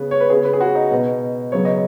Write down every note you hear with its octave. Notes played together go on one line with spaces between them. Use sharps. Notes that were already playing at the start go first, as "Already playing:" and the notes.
Already playing: C#3 B3 B4
C#5
B4
C#3 B3 G#4
B4
G#4
F#4
D#4
B2 B3
C#3 F#3 B3 C#5
D#5